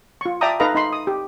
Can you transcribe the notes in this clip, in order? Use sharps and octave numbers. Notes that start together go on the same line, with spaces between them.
F4 C#6
D5 E5 G5 A5 A#5 D#6
D#4 A4 B4 D#5 F5 A#5
D#4 B5 C6
D#6
G4